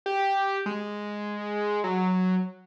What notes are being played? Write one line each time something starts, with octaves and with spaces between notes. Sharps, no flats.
G4
G#3
F#3